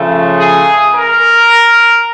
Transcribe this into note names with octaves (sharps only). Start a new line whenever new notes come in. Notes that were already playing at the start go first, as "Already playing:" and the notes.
Already playing: C#3 F3 A3
G#4
A#4